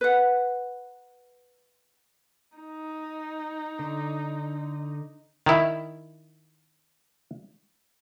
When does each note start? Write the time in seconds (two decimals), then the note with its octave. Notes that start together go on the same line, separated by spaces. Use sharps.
0.01 B4 F#5
2.57 D#4
3.79 D3
5.46 D#3 E4